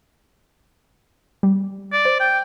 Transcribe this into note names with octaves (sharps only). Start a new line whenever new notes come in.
G3
D5
C5
G5